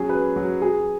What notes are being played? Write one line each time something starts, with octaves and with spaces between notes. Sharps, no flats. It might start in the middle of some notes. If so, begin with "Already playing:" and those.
Already playing: F#3 C#4 G#4
B4
F#3
G#4